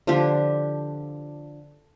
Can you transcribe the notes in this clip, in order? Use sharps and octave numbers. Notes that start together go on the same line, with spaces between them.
D3 F3 D4 G4